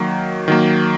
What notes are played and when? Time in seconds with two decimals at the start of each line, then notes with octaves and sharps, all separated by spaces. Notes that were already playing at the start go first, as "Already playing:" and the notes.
Already playing: D#3 F#3 A#3
0.48 D#3 F#3 A#3